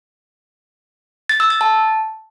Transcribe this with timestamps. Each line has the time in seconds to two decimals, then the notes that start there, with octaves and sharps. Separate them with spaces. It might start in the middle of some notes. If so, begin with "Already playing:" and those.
1.29 A6
1.40 E6
1.50 A6
1.61 A5